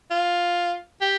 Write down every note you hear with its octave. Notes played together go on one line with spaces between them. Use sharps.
F4
G4